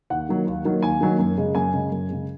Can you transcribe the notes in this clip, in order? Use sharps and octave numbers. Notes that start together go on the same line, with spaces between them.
D#2 F#5
D#3 F#3 A#3
D#2
D#3 F#3 A#3
D#2 G#5
D#3 F#3 A#3
F#2
C#3 G#3
F#2 G#5
C#3 G#3
F#2
C#3 G#3